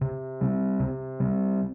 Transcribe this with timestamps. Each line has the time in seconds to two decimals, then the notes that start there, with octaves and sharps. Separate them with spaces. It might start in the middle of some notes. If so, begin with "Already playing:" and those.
0.01 C3
0.41 G3 C4
0.80 C3
1.20 G3 C4